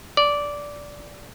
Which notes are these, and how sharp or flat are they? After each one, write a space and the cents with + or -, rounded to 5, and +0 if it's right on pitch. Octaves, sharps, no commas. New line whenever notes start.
D5 -10